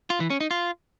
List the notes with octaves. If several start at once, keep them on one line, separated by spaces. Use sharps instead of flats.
F4
E3
C#4
D#4
F4